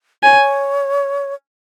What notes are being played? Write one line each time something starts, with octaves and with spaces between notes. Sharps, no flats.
C#5 G#5